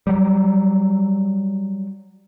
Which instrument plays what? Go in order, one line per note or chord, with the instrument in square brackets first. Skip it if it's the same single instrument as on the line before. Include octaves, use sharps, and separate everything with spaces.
[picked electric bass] F#3 G3